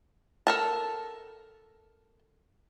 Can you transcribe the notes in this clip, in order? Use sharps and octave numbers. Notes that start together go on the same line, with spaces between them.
A4 A#4 A5